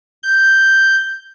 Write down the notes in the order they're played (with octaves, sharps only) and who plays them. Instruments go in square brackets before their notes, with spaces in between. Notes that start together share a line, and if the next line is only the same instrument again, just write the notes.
[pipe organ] G6